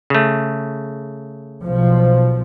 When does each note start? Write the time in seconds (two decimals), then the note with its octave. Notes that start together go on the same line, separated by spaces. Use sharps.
0.10 C#3 A3
1.65 B1 B2 F3